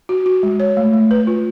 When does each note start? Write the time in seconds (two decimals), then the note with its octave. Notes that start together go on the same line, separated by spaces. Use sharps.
0.09 F#4
0.26 F#4
0.43 G#3
0.60 C#5
0.77 A3
0.94 A3
1.11 B4
1.27 F4